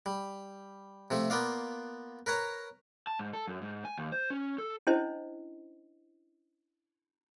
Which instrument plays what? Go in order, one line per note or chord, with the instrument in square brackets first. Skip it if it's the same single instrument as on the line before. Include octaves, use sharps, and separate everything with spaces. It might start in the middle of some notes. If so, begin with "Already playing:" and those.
[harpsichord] G3
C3 F3 A3
A#3 B3 F4 D5 F5
A#4 B4 C#5 A#5
[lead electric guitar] A5
G#2
A4
F#2
G#2
G#5
D#2
C5
C#4
A4
[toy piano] C#4 D4 E4 C5 D#5